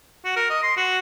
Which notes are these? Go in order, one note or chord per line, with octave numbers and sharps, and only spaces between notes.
F#4
A#4
D#5
C6
F#4